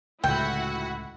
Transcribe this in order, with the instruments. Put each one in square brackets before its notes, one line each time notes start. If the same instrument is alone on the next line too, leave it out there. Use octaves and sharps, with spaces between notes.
[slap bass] C#2 A2 D3 [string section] E4 F#4 F#5 [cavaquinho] G5